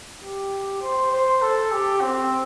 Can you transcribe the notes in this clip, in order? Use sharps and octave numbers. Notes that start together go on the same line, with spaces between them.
G4
C5
C5
A4
G4
C4